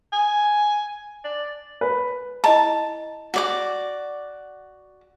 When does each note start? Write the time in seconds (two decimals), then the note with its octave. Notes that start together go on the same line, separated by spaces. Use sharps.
0.13 G#5
1.24 D5
1.81 B4
2.44 E4 D#5 A5 A#5
3.34 F#4 D5 D6